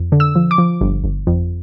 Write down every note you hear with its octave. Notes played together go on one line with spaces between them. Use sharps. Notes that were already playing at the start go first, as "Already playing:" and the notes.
Already playing: F2
D3
E6
F3
D6
F3
G1
G1
F2